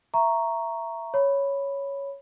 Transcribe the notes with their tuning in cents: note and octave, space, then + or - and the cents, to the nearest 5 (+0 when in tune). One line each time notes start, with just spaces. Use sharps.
E5 +15 A#5 +0 C#6 +0
C#5 +0 B5 +0